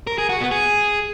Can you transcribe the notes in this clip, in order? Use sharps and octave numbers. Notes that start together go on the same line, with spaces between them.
A#4
G#4
F#4
B3
G#4